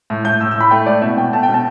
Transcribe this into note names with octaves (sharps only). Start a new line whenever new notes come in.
A2
A2 G6
A2 E6
E6
A2 B5
A3 G5
A2 D5
B2 E5
B2 G5
A3 A5
G5
B2
A5